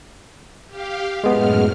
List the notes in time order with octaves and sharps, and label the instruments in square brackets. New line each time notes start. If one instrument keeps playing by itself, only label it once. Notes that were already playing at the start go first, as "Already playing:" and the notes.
[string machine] G4 F5
[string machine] F#2 A2 F6 [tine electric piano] G#3 B3 G#4